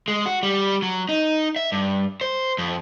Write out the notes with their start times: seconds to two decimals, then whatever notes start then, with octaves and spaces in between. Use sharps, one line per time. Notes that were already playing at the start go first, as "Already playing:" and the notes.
0.08 G#3
0.26 F#4
0.43 G3
0.82 F#3
1.09 D#4
1.56 E5
1.72 G2
2.21 C5
2.58 F2